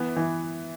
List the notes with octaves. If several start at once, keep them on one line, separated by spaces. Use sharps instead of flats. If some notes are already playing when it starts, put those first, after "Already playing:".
Already playing: E3 B3
E3